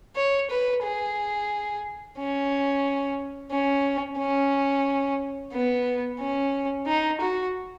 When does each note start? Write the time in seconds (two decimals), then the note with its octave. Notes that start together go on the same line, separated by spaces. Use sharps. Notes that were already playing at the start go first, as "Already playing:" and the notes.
0.15 C#5
0.50 B4
0.83 G#4
2.17 C#4
3.51 C#4
4.18 C#4
5.52 B3
6.20 C#4
6.87 D#4
7.21 F#4